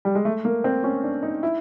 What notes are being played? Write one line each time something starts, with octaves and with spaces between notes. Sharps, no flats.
G3
G#3
A3
A#3
C4
C#4
D4
D#4
E4